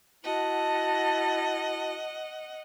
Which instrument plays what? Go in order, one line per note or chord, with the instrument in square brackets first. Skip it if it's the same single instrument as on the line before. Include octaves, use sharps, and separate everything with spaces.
[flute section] E4 F#4 A5 [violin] D#5 F#5